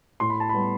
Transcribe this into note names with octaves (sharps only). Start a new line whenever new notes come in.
A2 C6
B5
A5
G3 B3 B5